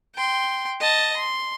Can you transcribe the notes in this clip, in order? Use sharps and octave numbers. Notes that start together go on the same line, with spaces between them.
G5 C6
D#5 A5
C6